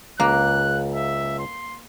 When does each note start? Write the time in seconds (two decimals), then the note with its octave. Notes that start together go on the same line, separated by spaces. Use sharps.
0.20 C#2 A#3 F#6
0.95 E5
1.39 C6